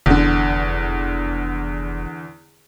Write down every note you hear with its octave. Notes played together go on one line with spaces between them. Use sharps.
F1 E2 D3